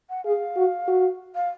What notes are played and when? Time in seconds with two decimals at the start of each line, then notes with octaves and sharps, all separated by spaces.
0.10 F#5
0.25 G#4 F5
0.56 F#4
0.88 F#4
1.35 F5